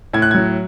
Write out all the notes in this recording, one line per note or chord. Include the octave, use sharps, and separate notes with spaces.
A2 G#6
F#6
F#3 G#6